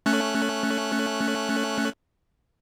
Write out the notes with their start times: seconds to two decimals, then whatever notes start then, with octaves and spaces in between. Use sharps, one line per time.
0.06 A3 C#4 F#6